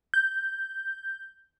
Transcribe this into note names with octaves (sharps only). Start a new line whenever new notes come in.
G6